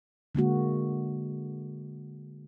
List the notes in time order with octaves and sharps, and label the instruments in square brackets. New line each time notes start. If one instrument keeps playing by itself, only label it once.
[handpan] D3 G#3 A#3 F#4